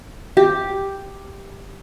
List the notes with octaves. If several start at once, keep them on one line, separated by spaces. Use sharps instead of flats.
G4